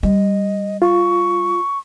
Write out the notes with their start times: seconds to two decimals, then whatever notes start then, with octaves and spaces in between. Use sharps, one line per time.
0.03 G3 D#5
0.82 F4 C#6